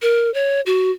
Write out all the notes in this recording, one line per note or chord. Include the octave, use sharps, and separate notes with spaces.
A#4
C#5
F#4